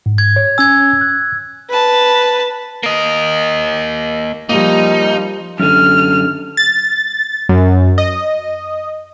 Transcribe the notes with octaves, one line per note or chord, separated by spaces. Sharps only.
G#2
G#6
C#5
C#4 G#5 E6 G#6
F#6
B4 A5
A#3 D#5
F3 G3 A#3 D#4
F#2 D3 F6
A6
F#2
D#5